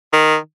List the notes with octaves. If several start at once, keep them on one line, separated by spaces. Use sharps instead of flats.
D#3